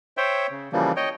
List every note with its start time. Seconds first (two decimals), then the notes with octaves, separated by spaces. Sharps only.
0.17 C5 C#5 E5 G5
0.51 C#3
0.72 C#3 E3 F3 G3 A#3
0.96 C#5 D#5 G5